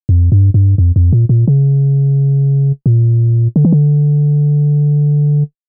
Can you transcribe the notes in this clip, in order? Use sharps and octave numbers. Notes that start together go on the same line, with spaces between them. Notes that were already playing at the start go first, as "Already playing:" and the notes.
F2
G2
G2
F2
F2
A#2
A#2
C#3
A#2
D3
E3
D3